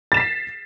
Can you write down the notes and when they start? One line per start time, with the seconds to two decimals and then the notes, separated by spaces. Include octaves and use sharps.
0.12 A6
0.14 E7
0.17 B6
0.20 C7